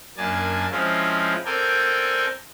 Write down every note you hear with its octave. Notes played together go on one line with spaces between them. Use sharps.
F#2 A#3 D4 G#5 A5
F3 G#3 C4 C#4 E4 F4
C4 A4 A#4 D5 G5 G#5